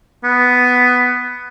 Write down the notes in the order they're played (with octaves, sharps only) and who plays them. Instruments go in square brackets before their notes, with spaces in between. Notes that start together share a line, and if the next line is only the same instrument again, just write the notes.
[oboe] B3